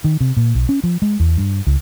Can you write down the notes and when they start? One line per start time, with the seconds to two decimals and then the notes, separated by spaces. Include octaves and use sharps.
0.04 D#3
0.20 C3
0.37 A#2
0.55 B1
0.69 C#4
0.84 F3
1.02 G#3
1.20 E2
1.37 G2
1.67 C#2